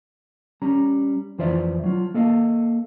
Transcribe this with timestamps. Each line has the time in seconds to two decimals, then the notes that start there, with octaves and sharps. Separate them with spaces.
0.62 G3 C#4 A#5
1.38 F2 E3 F4 C5 D5 E5
1.84 F#3 F4
2.14 A#3 A4 D#5 F5